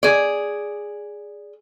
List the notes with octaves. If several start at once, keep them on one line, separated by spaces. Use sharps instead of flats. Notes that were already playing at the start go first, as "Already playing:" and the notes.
G#4 D5